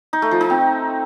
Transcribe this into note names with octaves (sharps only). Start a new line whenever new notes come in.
D#4
A3
F3
D#4
C4